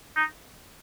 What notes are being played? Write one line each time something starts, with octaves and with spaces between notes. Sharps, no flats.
D#4